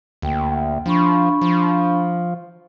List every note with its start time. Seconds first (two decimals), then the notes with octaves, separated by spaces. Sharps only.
0.22 D2 A#3 G5
0.86 F3 D4 B5 C#6
1.42 F3